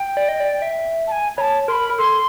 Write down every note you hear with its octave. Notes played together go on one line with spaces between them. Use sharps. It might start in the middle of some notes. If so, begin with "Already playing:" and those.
Already playing: G5
D5
D#5
D5
E5
A5
G#5
C#5 A5 B5
A#4 B5 C6
A#4
A4 C6